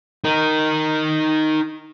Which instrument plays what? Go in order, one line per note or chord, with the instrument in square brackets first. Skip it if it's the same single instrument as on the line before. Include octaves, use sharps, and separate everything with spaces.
[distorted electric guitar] D#4 A#4